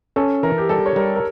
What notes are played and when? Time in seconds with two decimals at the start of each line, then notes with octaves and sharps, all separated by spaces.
0.16 C#4 A4
0.43 E3 A#4
0.58 G4
0.69 G3 A4
0.86 C#5
0.96 G3 A#4
1.16 A#4